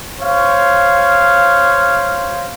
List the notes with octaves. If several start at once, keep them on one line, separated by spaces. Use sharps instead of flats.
C5 C#5 F5